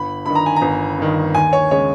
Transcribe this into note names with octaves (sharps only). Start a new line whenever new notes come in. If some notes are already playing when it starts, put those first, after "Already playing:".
Already playing: G1 B5
G2 D#3 B5
A#5
G#5
A#5
G1
G2 D#3
D#2 G#5
C#5
C#3 G#3 C#5